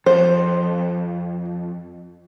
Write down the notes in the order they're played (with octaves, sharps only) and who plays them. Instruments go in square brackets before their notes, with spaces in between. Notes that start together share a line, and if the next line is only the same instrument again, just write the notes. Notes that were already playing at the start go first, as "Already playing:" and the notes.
[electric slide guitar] F2 [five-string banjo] C5